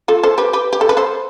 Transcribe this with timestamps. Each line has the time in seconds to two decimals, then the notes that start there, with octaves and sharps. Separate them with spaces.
0.08 F4 A4
0.23 A4 C5
0.38 G4 B4
0.53 G4 B4
0.73 G4
0.81 A4
0.89 B4
0.97 A4 C5